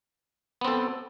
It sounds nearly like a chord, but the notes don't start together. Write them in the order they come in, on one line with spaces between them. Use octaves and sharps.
B3 C4 A4